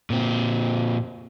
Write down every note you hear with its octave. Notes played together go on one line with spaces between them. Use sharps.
A#2 C4